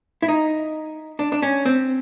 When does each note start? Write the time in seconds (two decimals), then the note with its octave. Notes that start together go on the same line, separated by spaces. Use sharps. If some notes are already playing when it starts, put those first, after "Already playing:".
0.22 E4
0.28 D#4
1.19 D4
1.32 D4
1.42 C#4
1.65 C4